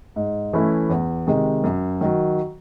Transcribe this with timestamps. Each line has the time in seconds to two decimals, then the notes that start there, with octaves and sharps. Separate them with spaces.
0.16 G#2
0.53 E3 A3 C#4 E4
0.90 E2
1.27 C3 D#3 G#3
1.64 F#2
2.01 D#3 F#3